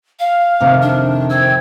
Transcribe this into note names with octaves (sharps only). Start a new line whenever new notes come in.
F5 F6
F2 C3 D#3
D4
C5 G5 E6 G#6